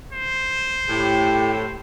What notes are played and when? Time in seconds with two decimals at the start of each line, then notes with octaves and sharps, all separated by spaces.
0.12 C5
0.89 A2 G4